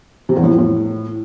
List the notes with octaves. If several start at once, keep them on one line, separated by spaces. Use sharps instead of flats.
C3
E2
A2
F2
A2